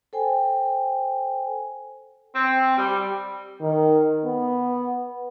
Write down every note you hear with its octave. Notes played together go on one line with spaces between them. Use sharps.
A4 C5 G5 G#5
C4
G3
D#3
B3